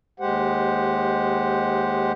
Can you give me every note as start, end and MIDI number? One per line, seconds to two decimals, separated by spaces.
0.20 2.12 39
0.20 2.12 56
0.20 2.12 67
0.20 2.12 72
0.20 2.12 78